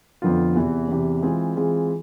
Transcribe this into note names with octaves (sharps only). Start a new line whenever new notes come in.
F2 D3 F3 B3 F4
E2 C3 E3
E2 C3 E3
E3 G#3 C4 F4 G#4
E3 G#3 C4 F4 G#4